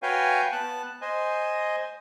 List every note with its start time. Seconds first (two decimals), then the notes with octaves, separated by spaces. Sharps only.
0.03 F#4 B4 C#5 F5 G5 G#5
0.52 B3 A5 F#6
1.02 C5 D#5 G#5